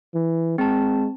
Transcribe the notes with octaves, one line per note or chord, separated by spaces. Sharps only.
E3
G#3 C4 A5